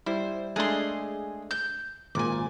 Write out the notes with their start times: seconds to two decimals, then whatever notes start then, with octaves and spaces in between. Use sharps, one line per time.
0.06 G3 E4 C5
0.56 G#3 A3 D4 G#4 C6
1.51 G6
2.15 G#1 A#2 G#5 D6